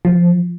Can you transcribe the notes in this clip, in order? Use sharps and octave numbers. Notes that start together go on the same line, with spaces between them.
F3